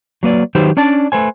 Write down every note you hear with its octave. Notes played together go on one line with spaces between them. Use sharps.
F#3 A#3 B4 D5
D#3 F#3 D#4 G4 B4 C5
C#4 D4 D5 A5
A3 B4 C5 G#5